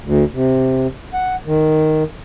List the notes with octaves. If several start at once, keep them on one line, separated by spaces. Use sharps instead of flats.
D2
C3
F#5
D#3